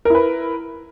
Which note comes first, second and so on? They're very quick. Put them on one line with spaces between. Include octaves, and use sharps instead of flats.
A#4 E4 B4